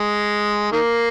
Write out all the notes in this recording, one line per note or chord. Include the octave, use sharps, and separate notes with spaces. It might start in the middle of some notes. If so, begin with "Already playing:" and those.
Already playing: G#3
D#3 A#3